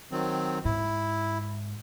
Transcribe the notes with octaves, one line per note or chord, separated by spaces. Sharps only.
D#3 F#3 C4
G#2 E4